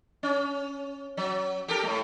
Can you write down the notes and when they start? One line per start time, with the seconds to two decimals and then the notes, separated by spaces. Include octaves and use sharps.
0.23 C#4
1.17 F#3
1.68 G4 A4 A#4
1.83 A2 A3